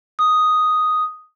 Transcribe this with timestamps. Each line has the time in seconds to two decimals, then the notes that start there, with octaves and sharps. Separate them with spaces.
0.19 D#6